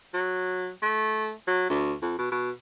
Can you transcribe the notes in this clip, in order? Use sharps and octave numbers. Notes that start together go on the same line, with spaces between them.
F#3
A3
F#3
D2
F2
B2
B2